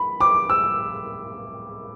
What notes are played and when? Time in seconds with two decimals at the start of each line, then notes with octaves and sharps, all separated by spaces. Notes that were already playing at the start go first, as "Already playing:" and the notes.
Already playing: B5
0.20 D6
0.50 E6